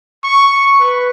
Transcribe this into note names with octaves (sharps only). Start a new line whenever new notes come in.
C#6
B4